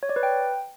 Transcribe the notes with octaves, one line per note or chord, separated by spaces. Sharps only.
C#5
D5
B4
G5